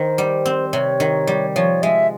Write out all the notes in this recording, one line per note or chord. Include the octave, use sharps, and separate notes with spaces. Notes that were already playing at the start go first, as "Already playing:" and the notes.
Already playing: D#3 C5
G3
C4
C3 C#5
D#3
G3
F3 C#5
G#3 E5